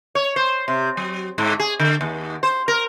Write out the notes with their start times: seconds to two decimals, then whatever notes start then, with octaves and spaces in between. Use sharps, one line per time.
0.15 C#5
0.36 C5
0.68 C3
0.97 F#3
1.38 G#2
1.59 G#4
1.79 D3
2.01 D#2
2.43 C5
2.68 A#4